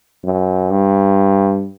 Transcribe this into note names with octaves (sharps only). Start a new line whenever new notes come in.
F#2
G2